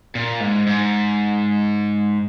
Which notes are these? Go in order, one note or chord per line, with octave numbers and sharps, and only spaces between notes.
A#2
G#2
G#2